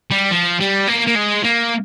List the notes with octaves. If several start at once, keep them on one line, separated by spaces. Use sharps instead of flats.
G3
F3
G3
A#3
A#3
G#3
A#3